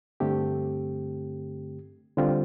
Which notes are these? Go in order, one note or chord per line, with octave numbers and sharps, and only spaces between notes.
G2 D3 A3 C4 G4
D3 G3 C4 F4